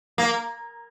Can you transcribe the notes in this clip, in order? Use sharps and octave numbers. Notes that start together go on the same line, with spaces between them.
A#3